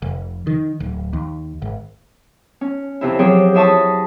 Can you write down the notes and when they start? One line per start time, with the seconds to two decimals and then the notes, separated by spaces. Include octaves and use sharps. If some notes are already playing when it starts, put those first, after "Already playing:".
0.02 F1
0.47 D#3
0.80 D1
1.13 D#2
1.62 G#1
2.61 C#4
3.01 F2 C3 E4
3.19 F3 F#3 C4 G4 G#4 C#5
3.54 E4 G#4 E5 A5 C#6 D#6
3.72 F#4